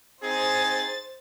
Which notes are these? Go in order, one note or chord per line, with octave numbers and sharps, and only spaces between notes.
C4 D#4 G#4 C5 A6